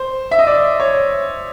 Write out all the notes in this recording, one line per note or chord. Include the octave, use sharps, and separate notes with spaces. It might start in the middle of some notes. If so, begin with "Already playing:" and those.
Already playing: C5
E5
D#5
D5
C#5